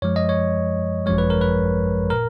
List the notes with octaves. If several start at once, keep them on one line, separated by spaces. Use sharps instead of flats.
F#2 F3 G#3 C#5
D#5
C#5
G#1 F#2 F3 G#3 C#5
B4
A#4
B4
A#2 A#4